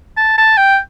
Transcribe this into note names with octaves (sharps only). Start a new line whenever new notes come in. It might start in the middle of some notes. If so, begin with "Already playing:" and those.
A5
A5
G5